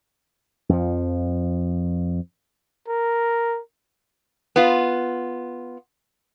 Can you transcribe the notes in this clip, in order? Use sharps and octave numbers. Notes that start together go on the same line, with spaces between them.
F2 F3
A#4
B3 F4